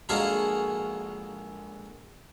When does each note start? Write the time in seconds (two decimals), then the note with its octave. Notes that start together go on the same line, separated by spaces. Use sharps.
0.09 A#1 G#3 F#4 A4 F5 A#5